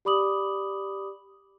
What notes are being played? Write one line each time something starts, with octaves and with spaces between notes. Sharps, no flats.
G4 D5 B5 D6 D#6 F#7